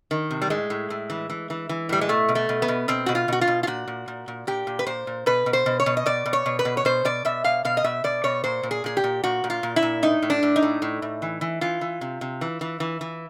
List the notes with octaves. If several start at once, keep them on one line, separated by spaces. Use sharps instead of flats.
D#3
C3
G3
A2 G#3
A2
A2
E3
E3
E3
E3
A2 G3
G#3
B2 A3
B2
A3
B2
B3
B2
B2 C4
B2 F#4
F4
B2 F#4
F4
B2
F4
A#2 F#4
A#2
A#2
A#2
A#2 G4
A#2
B4
A#2 C5
A#2
B2 B4
B2
C5
B2
C#5
B2
D#5
B2 D5
B2
C#5
B2
B4
B2
C#5
B2 C5
B2 D5
B2 E5
B2 F5
B2 F5
D#5
B2 E5
B2 D5
B2 C#5
A#2 C5
A#2
G#4
A#2 G#4
G4
A#2
A#2 F#4
A#2
F4
A#2
E4
A#2
A2 D#4
A2
D4
A2
D#4
A2
A2
A2
E3
E3
E3 F4
E3
C3
C3
E3
E3
E3
E3